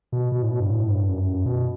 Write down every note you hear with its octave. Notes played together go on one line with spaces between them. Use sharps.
B2
B2
A2
B2
G2
A2
G2
F#2
B2